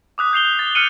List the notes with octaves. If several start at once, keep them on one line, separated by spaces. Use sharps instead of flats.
D6 D#6 F#6 B6
G6 C7 F7 G7
G6
D#6 A6
F6 F#6 C#7 D#7 F#7